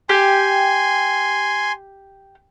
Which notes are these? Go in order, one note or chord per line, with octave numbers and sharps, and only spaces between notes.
G4 G#5 C6